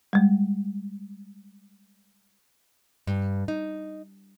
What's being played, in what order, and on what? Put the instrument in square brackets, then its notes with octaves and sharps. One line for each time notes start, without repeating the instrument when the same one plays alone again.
[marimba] G3 G#3
[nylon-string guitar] G2
D#4